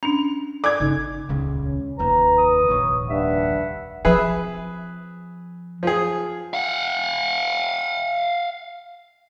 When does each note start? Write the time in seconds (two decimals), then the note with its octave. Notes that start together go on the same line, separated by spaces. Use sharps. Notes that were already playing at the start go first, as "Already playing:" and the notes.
0.03 C#4 D4 F7
0.64 A4 D5 G#5 D6 G#6
0.80 G1 C#3 D#4
1.29 D#1 C#2 C#3
1.64 C#4
1.99 F1 D#2 B4 A#5
2.38 D#6
2.69 F1 A#1 D#2 C#5
3.09 G2 E5 F#5
4.05 F3 C4 G#4 B4 E5
5.83 F3 G#4
6.54 F5 F#5